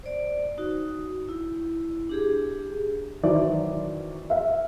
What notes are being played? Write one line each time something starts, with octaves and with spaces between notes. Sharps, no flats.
C5 D5
D#4 F#4
E4
D4 G4 G#4
D#3 E3 F#3 C5 D5
E5 F5